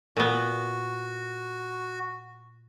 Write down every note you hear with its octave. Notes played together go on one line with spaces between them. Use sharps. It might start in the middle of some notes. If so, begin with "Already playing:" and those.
A#2 B3 F#4